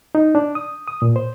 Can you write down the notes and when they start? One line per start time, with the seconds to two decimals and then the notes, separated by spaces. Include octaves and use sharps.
0.15 D#4
0.35 D4
0.55 D#6
0.88 D#6
1.02 A#2
1.16 C5